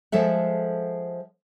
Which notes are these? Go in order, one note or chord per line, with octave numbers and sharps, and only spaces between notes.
F3 G#3 A4 E5 F#5